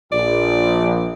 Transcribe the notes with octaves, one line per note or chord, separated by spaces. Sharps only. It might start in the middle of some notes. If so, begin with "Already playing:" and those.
A#1 D5